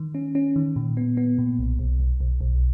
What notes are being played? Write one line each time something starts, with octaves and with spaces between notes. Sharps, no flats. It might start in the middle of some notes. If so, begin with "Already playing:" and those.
Already playing: D#3
C#4
C#4
D#3
A#2
B3
B3
A#2
B1
B1
B1
B1
B1